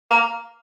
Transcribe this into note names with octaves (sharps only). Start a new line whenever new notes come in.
A#3